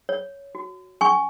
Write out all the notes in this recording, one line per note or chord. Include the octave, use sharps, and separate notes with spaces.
C#5
F#4
C#4 G#5 C#6